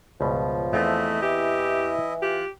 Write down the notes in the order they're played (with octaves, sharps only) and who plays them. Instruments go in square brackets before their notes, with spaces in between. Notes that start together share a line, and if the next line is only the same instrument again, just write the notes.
[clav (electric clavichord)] C#2 G2 B2 [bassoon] F3
[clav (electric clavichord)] E2 C4 [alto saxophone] A3 [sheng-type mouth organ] E4 D#5
[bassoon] E3 [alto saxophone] G4
[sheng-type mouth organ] F4 F#6 [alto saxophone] G4